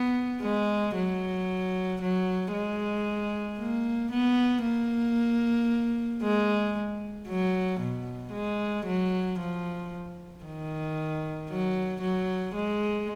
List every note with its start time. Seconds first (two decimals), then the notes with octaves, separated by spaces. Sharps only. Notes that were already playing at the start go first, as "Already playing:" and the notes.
Already playing: B3
0.42 G#3
0.95 F#3
2.01 F#3
2.53 G#3
3.58 A#3
4.11 B3
4.64 A#3
6.22 G#3
7.28 F#3
7.80 B2
8.32 G#3
8.86 F#3
9.39 F3
10.44 D#3
11.49 F#3
12.01 F#3
12.55 G#3